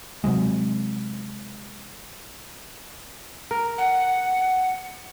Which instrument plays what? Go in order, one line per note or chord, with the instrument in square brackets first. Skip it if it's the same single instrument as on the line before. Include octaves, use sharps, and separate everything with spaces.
[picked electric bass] C3 F#3 G#3
[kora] A#4
[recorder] F#5